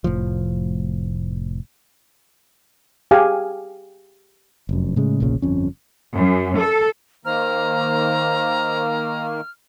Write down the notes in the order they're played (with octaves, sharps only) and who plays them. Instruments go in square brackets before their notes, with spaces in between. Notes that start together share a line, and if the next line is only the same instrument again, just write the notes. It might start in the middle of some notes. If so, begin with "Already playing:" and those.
[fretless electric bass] F1 A2 F3
[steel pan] G4 G#4 F5 G#5
[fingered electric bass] F1 F#2
A2 C#3 G#3
F1 A#1 A#2 C#3
G1 F2 C#4
[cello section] F#2
A4
[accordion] D#3 A#3 [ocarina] C5 [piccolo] A#5 [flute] F6